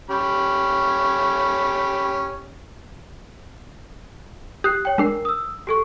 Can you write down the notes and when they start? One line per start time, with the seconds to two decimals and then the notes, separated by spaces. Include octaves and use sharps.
0.10 C#4 G4 B5
4.64 G4 D#6 F#6 C7
4.85 C#5 G5
4.98 G#3 D4 A#4 C7
5.25 D#6 E6
5.67 G4 A4 C#6